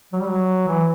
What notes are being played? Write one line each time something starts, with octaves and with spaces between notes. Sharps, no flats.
F#3
G3
F#3
E3